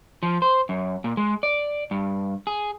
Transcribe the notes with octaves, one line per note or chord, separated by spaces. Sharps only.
F3
C5
F#2
A#2
G#3
D5
G2
G#4